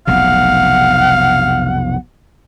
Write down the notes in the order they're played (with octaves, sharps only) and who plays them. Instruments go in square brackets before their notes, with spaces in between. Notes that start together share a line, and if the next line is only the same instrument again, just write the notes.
[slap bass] F1 B1 C3 [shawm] F5 [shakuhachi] F#5